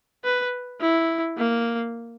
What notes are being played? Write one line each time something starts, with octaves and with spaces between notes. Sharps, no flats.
B4
E4
A#3